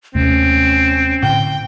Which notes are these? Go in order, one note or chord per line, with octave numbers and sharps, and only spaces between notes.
D#2 C3 A3 C4 C#4
A2 D3 G5